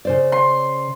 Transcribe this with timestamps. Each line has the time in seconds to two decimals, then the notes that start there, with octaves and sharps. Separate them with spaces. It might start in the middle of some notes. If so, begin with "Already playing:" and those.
0.05 C#3 C5 D5
0.32 C6